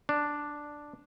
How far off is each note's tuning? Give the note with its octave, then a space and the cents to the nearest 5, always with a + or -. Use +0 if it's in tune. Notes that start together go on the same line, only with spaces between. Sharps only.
D4 +0